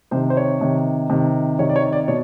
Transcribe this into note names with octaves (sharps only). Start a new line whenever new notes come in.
C3 D#3 C5
C5
C#5
C3 D#3
C3 D#3
C3 D#3 C#5
D5
C#5
D5
B2 C#5